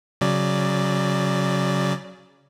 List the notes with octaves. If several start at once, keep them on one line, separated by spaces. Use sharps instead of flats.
C#3 F#3 D5